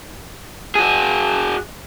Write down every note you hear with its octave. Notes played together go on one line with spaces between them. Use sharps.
F#4 G#4